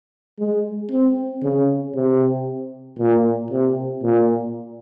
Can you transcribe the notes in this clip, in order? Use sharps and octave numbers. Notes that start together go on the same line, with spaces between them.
G#3
C4
C#3
C3
A#2
C3
A#2